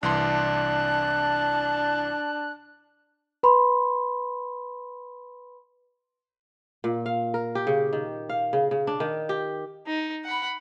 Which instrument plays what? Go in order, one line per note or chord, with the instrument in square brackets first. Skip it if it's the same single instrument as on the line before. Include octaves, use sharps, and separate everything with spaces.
[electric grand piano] C2 E3 C6 [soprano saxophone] D4 [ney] A5 [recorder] F#6
[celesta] B4 B5 C6
[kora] A#2
F5
A#4
G4
C#3
D#3
F5
C#3
C#3
D4
D#3
G4
[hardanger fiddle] D#4
F#5 B5